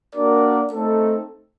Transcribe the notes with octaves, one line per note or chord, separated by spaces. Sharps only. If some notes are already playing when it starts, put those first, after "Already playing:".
A#3 D4 F#4 A#4 D5
A3 C4 D#4 A4